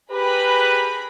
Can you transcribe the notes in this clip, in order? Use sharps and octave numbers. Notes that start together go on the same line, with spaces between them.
G4 G#4 A#4 B4 B5